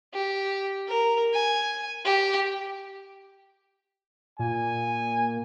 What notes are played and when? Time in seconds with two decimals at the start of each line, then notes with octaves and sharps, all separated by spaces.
0.14 G4
0.88 A#4
1.34 G#5
2.05 G4
4.39 A#2 G#5